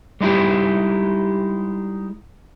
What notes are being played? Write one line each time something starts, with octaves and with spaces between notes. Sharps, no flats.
G3 G#3 D#4 E4 G4